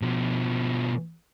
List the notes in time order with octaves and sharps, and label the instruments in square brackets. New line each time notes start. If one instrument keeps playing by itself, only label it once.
[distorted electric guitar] B2 F3